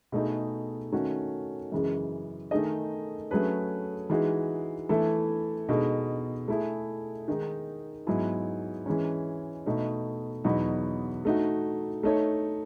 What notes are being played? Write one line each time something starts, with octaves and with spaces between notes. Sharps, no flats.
B2 A3 D#4 G#4
D#3 A3 C#4 F#4
F#2 C#3 E3 G#3
D#3 A3 D#4 G#4 D#5
F#3 A3 C#4 G#4 B4
E3 G#3 D#4 F#4
E3 A3 E4 A4
B2 G#3 D#4 A4
A3 E4 G#4
D#3 G#3 D#4
G#2 F#3 B3 E4 G#4
E3 G#3 C#4
B2 A3 D#4
E2 B2 F#3 B3 D#4
A3 D#4 F#4
A3 D#4 A4 C#5